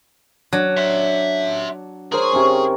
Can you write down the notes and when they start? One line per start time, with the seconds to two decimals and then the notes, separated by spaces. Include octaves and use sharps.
0.53 F#3 D4
0.77 E5 C6
2.12 G#4 A#4 C5 C#5
2.33 C3 C#4 D#4